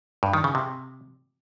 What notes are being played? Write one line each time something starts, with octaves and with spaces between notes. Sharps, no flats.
G2
D#3
C#3
C3